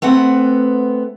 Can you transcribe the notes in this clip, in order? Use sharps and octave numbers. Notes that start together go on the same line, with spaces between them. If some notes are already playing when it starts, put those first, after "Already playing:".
A3 B3 C4 F#5